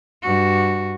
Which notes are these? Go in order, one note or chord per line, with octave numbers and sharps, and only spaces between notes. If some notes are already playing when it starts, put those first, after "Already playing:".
G2 F#4